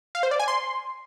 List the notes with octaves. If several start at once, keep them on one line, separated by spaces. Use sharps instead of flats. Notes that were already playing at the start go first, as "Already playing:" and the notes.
F5
C5
D5
G#5
C6